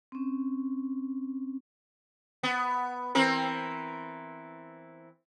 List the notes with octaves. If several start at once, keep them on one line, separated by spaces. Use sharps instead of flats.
C4 C#4
B3
E3 C4 A#4